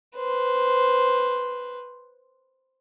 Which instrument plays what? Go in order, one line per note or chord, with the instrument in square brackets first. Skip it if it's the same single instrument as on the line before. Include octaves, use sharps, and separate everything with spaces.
[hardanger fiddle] B4 C5